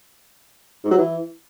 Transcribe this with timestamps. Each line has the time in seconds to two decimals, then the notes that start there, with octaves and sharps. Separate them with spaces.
0.84 G#2
0.91 F#3
0.97 E3